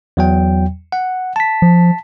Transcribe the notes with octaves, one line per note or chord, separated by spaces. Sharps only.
E2 F#3 G5
F#5
A5 B6
F3